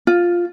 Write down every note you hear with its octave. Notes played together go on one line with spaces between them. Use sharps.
F4